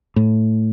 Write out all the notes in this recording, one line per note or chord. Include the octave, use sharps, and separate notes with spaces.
A2